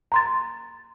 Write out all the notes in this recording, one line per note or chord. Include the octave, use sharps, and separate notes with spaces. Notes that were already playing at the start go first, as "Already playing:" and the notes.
A#5 C6 A6